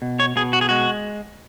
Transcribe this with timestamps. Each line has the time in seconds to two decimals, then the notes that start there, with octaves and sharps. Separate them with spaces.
0.02 B2
0.20 C#5
0.36 B2 G#4
0.53 F#4
0.61 G#4
0.69 G#3 F#4